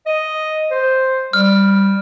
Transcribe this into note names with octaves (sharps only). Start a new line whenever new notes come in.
D#5
C5
G3 F6